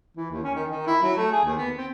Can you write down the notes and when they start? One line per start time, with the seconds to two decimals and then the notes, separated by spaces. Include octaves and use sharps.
0.17 E3
0.31 D#2
0.43 C#4
0.55 D#3
0.70 D#3
0.87 E4
1.03 F#3
1.17 A3
1.32 G#4
1.44 D#2
1.57 B3
1.77 C4